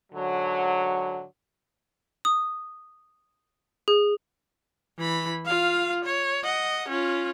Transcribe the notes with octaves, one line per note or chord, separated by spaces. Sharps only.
G#2 D3 F#3
D#6
G#4
E3 B5
F4 F5
C#5
D#5 F#5
C#4 F4